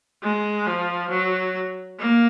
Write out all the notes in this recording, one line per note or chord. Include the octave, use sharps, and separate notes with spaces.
G#3
F3
F#3
A#3